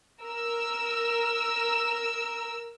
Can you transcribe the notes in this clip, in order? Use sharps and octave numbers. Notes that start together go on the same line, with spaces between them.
A#4 E6